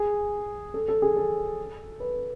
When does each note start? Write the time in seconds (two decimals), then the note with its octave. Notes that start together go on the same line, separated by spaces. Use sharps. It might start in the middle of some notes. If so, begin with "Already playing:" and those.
Already playing: G#4
0.74 A4
0.88 A4
1.02 G#4
1.16 A4
2.00 B4